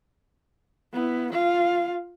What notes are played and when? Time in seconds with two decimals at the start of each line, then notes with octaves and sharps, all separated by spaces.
0.93 B3 E4
1.32 F4 F5